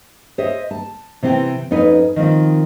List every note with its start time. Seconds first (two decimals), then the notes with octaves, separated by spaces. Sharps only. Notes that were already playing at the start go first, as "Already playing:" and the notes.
0.38 C5 C#5 D#5 E5
0.71 A5
1.23 C3 E3 C4 E4 G5
1.71 F2 C#4 D#4 B4 G#5
2.16 D#3 F3 C4